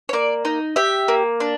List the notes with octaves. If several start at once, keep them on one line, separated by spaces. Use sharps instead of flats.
C#5
A#3 D5
D#4
G4 E5
A#3
D4